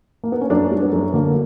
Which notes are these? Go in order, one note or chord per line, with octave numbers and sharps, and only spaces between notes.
A#3
B3
C#4
F#2 D4
G3
B3
F#2
D3 A#3